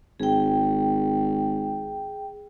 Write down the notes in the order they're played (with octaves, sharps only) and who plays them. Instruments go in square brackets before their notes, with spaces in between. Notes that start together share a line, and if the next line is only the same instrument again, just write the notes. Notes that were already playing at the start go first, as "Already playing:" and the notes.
[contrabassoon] G#1 [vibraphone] G#4 G5